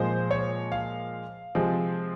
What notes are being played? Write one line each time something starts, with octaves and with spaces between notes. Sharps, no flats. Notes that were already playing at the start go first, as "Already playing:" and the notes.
Already playing: A#2 F3 G#3 C5
C#5
F5
C3 F3 G#3 C4